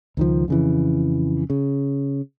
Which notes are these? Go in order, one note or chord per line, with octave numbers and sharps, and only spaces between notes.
C#2 D#3 F3
F2 C#3 E3
C#3